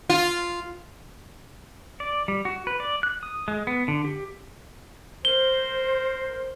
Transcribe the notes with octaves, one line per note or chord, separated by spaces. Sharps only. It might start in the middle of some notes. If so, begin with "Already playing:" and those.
F4
D5
G3
F#4
B4
D5
F#6
D#6
G#3
B3
D3
G4
A#4 C5 G7